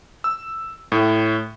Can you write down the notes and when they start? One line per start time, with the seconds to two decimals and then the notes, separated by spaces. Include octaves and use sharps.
0.24 E6
0.92 A2